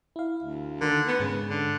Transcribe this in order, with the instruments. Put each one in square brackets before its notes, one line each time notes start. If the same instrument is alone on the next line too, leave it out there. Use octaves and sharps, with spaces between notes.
[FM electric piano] E4 F5
[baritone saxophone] D2
[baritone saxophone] D3 [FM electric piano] D#3 A#4
[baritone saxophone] B3
[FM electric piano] G#2 [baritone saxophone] C#3
[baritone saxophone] D3